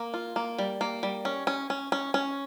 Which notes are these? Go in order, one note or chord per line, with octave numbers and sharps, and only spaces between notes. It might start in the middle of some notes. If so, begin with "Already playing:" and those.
Already playing: A#3
F4
A#3
G3
A#3
G3
C#4
C#4
C#4
C#4
C#4